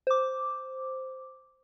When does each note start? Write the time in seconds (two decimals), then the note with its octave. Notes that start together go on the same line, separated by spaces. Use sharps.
0.07 C5 D6